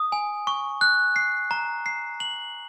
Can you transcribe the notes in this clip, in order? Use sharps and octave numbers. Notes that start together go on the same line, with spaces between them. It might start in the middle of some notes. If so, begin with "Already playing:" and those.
Already playing: D#6
G#5
C#6
F#6
C7
A#5
C7
F#7